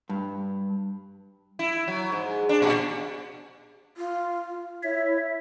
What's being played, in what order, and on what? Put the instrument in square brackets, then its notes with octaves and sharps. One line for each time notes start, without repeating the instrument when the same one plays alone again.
[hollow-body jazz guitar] G2
[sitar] E4
F#3
G#2
D4
A#2
[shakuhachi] F4
[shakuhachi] E4 [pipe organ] C#5 E5